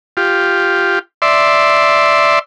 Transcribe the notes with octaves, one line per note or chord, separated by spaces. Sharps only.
F4 G4
D5 E5 C6